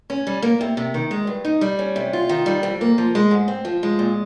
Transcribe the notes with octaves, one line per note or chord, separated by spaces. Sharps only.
C#4
G3
A#3
C3
C3
D#3
G#3
G2
D#4
G3
C#4
C3
F4
D#3
G3
F2
A#3
F3
G#3
G#2
C4
F3
G#3
A#2